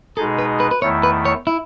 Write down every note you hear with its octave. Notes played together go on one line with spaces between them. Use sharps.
B2 G#3 D#4 G#4 A4
B4
B4
B4
E2 D#3 A3 E4 C#5
B4
C#5
E4